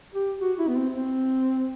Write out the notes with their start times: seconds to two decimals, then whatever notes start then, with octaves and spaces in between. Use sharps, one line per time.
0.15 G4
0.41 F#4
0.59 E4
0.68 B3
0.77 C4
0.94 C4